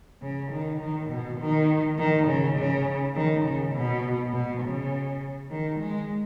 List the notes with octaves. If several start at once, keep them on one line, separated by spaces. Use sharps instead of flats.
C#3
D#3
D#3
B2
D#3
D#3
C#3
C#3
D#3
C#3
B2
B2
C#3
D#3
G#3